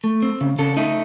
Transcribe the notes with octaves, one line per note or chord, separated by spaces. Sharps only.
A3
C4
C#3
C#3 A4
A3 D#4